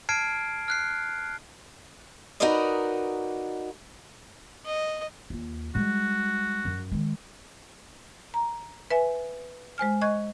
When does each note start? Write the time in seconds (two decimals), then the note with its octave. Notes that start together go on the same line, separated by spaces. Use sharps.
0.09 A5 F6 G#6 C7 D7
0.68 F6 F#6 C7
2.40 D#4 F#4 A#4 B4 D5 D#5
4.65 D#5
5.30 D#2 F4
5.75 G3 G#3 F#4
6.65 F#2
6.92 D#3 G#3
8.34 A#5
8.90 B4 E5 G#5
9.78 G#3 C5 G#5 F6
10.02 D#5 C#6 F#6 G#6